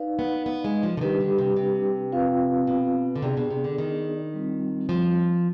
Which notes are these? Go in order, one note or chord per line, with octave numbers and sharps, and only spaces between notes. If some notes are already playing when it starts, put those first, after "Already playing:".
Already playing: D#4 B4 D5 F5
B3
B3
G#3
F3
D3
D#3 G3 D4 G4 B4
D3
C3
C3
C4 F4 B4 F5
B2
D3
C3 B3 D4 G#4 D5
B2
C3
D3
D#3
G3 C4 F4
F3